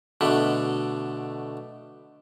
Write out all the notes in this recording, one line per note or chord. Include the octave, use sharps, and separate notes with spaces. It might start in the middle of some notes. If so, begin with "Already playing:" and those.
B2 D3 A3